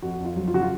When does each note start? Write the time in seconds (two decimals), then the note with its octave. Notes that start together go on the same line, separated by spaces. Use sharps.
0.02 F2 F#4
0.20 F2
0.25 F4
0.36 F#3
0.48 F4
0.54 C#3 F#4
0.62 F4